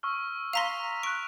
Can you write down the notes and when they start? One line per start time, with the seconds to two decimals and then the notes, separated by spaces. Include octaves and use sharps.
0.03 C#6 E6 F6
0.53 F5 A#5 C6 A#6 B6 F7
1.03 C#6 F#6 D7